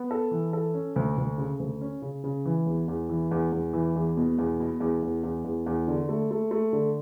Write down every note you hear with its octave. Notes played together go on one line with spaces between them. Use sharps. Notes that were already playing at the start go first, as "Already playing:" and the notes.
Already playing: B3
A4
E3
A4
C#4
D2
D2
C#3
D2
C#4
C#3
C#3
E3
E2
E2
E3
E2
E2
E3
E2
B2
E2
B2
E2
E2
E2
E2
E2
D3
A3
A3
A3
D3